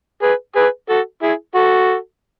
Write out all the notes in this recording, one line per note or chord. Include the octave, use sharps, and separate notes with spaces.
G#4 B4
G#4 B4
F#4 A4
E4 G#4
F#4 A4